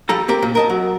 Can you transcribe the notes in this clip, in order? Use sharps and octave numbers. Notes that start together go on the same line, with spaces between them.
F3 G3 A4 A#5
C4 G4 A#4
A#2
A#4 D#5 A5
F#3